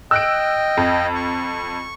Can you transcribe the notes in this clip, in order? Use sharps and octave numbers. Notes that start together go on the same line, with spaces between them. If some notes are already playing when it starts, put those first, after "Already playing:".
D#5 G5 E6 F#6 D7
F2
C#6